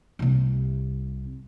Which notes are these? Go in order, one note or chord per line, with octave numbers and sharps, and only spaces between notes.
C2 C3